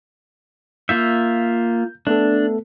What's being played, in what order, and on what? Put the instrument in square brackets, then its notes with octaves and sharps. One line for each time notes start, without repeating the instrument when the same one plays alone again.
[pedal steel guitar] A#3 F4 E5 [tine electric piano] G6
[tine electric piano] A3 B3 A4 [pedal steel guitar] D4